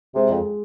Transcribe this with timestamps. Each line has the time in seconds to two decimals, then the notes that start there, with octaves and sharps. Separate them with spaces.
0.15 C3 G#3
0.29 F2